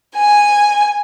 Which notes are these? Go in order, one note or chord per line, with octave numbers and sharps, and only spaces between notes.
G#5